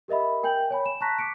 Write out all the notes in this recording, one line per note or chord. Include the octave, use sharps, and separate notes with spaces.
G4 A#4 D#5 E5 B5
A#4 G5 G#5 G6 F#7
C#5 G#5 B5
E7
A5 A#5 C#6 F#6 A#6 B6
D6 B6 C#7 D7